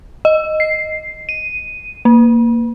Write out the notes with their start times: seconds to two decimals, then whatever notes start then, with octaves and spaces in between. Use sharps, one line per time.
0.25 D#5
0.60 C7
1.29 D#7
2.05 A#3